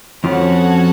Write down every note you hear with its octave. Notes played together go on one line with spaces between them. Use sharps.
F2 F3 C#4 F#4 A4 C#5 F#5